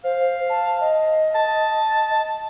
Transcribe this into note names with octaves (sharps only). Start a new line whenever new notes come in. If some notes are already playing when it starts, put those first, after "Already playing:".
C5 F5
A5
D#5
A5